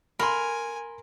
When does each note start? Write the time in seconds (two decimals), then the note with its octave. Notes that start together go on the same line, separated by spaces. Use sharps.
0.19 A#4 G#5 B5 C6